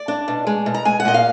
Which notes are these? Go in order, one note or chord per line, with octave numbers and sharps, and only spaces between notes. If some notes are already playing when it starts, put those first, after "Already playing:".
Already playing: D5
D4
B2
G#3
B2
A#5
G#3 G#5
F#5
A#2 D#5
F5